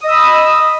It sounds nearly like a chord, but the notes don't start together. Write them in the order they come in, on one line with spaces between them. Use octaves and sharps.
D#6 D#5 E6 B5